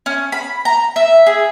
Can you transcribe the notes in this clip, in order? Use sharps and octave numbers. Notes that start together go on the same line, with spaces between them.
C#4
B5
A#5
E5
G#4